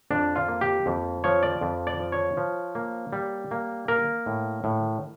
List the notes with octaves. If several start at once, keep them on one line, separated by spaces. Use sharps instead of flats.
F2 D4
F4
A#3
G4
F2
F3 C#5
D5
F2
D5
F3
C#5
F3
A#3
G3
A#3
A#3 A#4
A2
A2